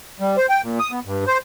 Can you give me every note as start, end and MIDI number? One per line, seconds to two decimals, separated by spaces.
0.20 0.36 55
0.37 0.46 72
0.49 0.62 79
0.63 0.79 46
0.79 0.91 87
0.91 1.00 59
1.05 1.24 43
1.27 1.38 72